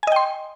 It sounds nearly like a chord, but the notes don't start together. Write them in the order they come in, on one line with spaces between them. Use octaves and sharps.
G#5 D#5 G5 C6